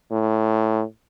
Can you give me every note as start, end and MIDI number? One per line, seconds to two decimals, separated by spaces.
0.12 0.83 45